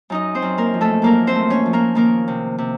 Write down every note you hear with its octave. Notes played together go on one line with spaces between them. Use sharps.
F#2 D#4 D#5
C4 C5
F#2
A#3 A#4
F3
A3 A4
F#2 A#3 A#4
C4 C5
A3
C#4 C#5
F3
A#3 A#4
D#3 A#3 A#4
C3
C3